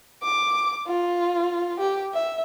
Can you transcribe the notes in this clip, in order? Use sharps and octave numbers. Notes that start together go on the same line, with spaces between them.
D6
F4
G4
E5